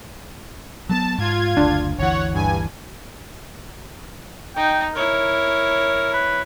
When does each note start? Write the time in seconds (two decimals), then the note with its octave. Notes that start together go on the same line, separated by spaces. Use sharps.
0.89 F#3 G#3 B3 A5
1.18 G#2 F4 G#6
1.57 F#1 D2 D4
1.98 G1 D2 E3 C#5 F#5
2.33 G2 G#5
4.56 D#4 G5
4.95 E4 A#4 C#5
6.13 B4